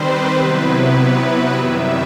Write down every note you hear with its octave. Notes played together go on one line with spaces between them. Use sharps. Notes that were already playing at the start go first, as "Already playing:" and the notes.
Already playing: D#3 G3 C4 B4 C5
C3 F#3 B3 E4 B4
F#2 D#3 G3 E5